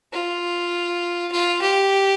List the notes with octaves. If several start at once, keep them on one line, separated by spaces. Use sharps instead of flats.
F4
F4
G4